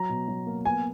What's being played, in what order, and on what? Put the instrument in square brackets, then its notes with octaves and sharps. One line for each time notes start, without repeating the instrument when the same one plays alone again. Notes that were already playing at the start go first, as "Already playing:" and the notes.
Already playing: [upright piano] F#3 [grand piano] A#5
[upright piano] B2
F#3
A#3
[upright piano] B3 [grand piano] G#5